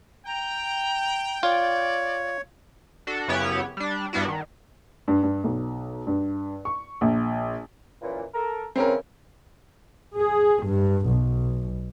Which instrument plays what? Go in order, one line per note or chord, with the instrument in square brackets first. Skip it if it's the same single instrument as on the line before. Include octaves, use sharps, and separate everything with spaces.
[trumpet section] G5 [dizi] A#5
[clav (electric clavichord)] F4 [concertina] C#5 [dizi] D5
[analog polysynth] D4 F#4 A4
F#2 C#3 B3 E4 G4 C#5
G3 D4
G2 G3 B3 D4 E4 F#4
D#3
[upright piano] G2
G2
B1
G2
C#6
A#1
[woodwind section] F#2 A#2 E3
A4 A#4 A#5
[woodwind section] C#3 E3 [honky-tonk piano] C4 C#4 A#4
[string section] G#4
G2
B1